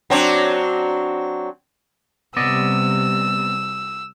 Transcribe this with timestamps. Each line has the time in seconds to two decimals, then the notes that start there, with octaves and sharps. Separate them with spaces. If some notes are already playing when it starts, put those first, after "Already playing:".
0.10 F#3 C4 D4
2.37 C3 G3 B3 D5 D#5 E6